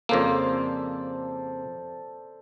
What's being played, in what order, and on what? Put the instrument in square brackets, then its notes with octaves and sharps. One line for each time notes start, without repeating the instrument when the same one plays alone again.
[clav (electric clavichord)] F2 C#3 A#3 [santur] A4 C5 D5